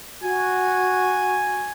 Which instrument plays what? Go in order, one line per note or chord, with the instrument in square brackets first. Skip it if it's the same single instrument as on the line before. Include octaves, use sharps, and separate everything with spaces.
[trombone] F#4 [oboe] G#5